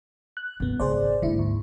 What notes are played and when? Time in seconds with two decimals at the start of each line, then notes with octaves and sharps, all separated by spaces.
0.37 F#6
0.60 F#2 A#2 E3 B3
0.80 G#1 C#2 G#4 C5 D5
1.22 G#2 D3 A#3 E4
1.39 D2